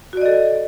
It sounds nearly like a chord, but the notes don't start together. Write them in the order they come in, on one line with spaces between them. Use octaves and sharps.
F#4 D5 D#5 A4